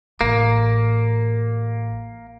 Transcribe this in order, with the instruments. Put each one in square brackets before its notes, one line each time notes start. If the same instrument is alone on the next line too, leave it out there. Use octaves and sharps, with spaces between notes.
[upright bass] A1 [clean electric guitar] A#3